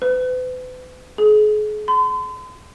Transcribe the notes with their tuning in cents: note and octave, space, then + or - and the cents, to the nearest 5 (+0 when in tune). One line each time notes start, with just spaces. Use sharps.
B4 +40
G#4 +35
C6 -40